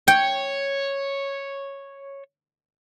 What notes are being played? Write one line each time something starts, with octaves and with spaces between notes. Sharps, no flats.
C#5 G5